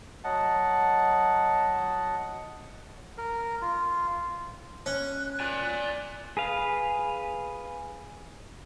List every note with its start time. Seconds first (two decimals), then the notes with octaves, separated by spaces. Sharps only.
0.24 F#3 D#5 F#5 A5
3.18 A#4
3.62 F4
4.86 C#4 F#6
5.40 D5 G#5
6.37 G#4 B4 F5